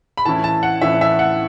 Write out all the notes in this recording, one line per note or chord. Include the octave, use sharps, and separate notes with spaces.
B5
A2 E3 C#4 E4 A5
A5
F#5
A2 E3 C#4 E4 E5
E5
F#5